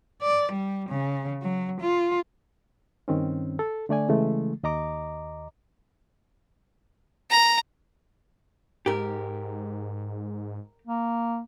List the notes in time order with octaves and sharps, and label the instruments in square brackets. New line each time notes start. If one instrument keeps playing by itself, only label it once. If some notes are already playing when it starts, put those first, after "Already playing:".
[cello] D5
G3
C#3
F#3
F4
[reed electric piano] G2 D#3 C4 C#4
A4
D3 A3 D5 G#5
C#3 E3 G#3 A3
D#2 D#5 A#5 D6
[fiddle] A#5
[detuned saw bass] G#2 [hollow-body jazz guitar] G4 A#4
[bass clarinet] A#3